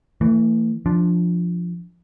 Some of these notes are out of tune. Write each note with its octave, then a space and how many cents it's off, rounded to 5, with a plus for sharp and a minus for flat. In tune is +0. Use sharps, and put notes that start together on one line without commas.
E3 +10 A3 +40
F3 +0 D4 +0